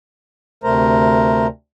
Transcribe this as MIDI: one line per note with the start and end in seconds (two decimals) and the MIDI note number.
0.64 1.47 38
0.64 1.47 48
0.64 1.47 57
0.64 1.47 70
0.64 1.47 72
0.64 1.47 82